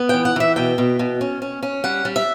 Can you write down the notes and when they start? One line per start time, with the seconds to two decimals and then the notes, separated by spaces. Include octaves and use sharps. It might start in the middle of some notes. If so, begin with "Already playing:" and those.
Already playing: B3
0.09 E3 G5
0.25 F#5
0.36 E3 E5
0.56 B2 G5
0.78 B2
0.99 B2
1.21 C#4
1.42 C#4
1.63 C#4
1.84 G3 F#5
2.05 G3
2.16 E5